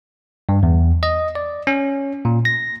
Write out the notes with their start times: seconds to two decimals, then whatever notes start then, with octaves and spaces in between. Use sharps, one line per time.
0.49 G2
0.63 E2
1.03 D#5
1.35 D5
1.67 C#4
2.25 A#2
2.45 A#6